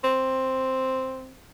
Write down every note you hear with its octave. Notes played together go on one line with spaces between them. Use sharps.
C4